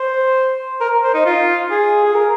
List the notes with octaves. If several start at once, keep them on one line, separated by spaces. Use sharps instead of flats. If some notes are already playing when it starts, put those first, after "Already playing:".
Already playing: C5
A#4
C5
D#4
F4
G#4
G#4
A#4